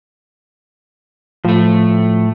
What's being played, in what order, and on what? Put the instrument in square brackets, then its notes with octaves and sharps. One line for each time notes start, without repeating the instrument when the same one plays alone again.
[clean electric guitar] A2 A3 [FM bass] F3